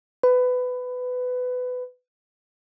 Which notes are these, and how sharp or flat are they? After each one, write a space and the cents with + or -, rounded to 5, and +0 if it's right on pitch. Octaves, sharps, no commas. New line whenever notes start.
B4 +20